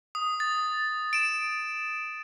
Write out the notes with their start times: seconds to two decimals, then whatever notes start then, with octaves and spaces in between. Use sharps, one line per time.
0.15 D#6
0.40 A6
1.13 D7 E7